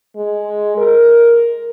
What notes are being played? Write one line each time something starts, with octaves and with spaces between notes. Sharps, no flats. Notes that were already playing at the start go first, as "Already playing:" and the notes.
G#3
A#4